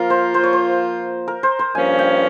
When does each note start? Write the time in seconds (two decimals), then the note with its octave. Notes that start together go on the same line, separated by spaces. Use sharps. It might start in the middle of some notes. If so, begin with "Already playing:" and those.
Already playing: F3 A#3 F4 A#4
0.10 C5
0.34 C5
0.44 C#5
0.53 C5
1.28 A#4
1.43 C5
1.59 C5
1.75 G2 F3 A#3 C#4 G#5
1.99 G5